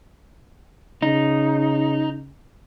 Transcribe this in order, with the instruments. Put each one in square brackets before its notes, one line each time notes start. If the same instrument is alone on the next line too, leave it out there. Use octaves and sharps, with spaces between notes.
[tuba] C#3 [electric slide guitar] D#4